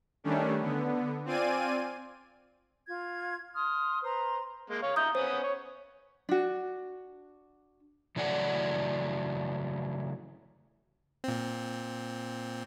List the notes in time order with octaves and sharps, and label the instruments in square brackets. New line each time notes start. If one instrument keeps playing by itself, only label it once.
[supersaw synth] D#3 G3 A3 C#4 D4
D3 B3
C4 F4 D5 G#5 D#7
[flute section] F4 G#6
C6 D#6 F6
B4 C5 A#5 C6
[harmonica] G#3 A#3
C#5 F5
[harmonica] D#5 E5 A#5 [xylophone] D#6 G6
[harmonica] B3 C#4 D#6 [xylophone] C5
[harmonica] C#5
[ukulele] D4 F#4
[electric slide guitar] C#3 E3 F#3 A3 D5 F#5
[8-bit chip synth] A#2 C4